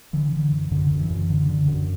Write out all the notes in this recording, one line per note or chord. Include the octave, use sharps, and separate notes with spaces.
D3 E3
D3
F#2
F#2 D3
F#2
E3
F#2
D3
D3
F#2